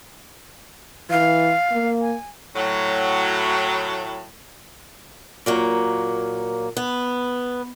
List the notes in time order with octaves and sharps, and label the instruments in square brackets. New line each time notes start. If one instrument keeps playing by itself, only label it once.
[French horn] E3 [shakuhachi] F5
[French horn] A#3
[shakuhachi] G#5
[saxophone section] A2 F#3
[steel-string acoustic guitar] A#2 F#3 A#3
B3